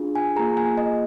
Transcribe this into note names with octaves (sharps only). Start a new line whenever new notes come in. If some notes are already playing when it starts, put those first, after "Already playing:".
Already playing: D4 F4 G#4
G#5
A#3 F4 G#4 A#5
G#5
D#5